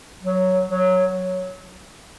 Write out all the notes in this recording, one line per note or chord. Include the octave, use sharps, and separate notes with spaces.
F#3
F#3